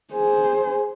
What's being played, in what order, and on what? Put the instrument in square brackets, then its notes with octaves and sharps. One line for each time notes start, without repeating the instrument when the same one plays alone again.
[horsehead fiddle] G#4 C5